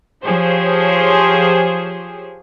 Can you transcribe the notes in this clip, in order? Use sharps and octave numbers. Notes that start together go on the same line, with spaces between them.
F3 G4 G#4 C5 C#5